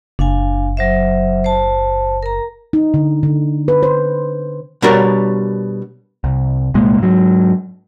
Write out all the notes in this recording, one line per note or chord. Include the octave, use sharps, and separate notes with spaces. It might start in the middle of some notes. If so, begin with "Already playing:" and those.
F#1 D4 F5 G#5
F#3 C5 E5
C5 A5
A#4 A#5
D#4
D3
D3
B4
C5
B2 G3 D4 A#4 C#5
C2
C2 A#2 G#3 A#3
G#2 F#3